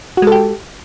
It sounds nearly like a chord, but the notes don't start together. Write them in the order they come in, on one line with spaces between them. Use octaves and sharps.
F#4 G#3 A4 G4